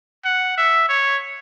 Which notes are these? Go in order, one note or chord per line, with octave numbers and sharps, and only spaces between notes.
F#5
E5
C#5